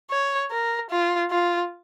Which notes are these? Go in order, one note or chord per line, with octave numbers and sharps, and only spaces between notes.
C#5
A#4
F4
F4